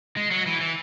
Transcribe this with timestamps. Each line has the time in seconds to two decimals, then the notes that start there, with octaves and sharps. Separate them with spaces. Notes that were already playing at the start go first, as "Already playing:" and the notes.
0.17 G#3
0.31 F#3
0.46 E3
0.61 E3